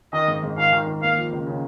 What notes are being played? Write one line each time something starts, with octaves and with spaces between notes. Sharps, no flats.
D#3 D#5
G#2
G#2
D#3 F5
D#3
D#3
A#3 F5
F3
C#2
C#3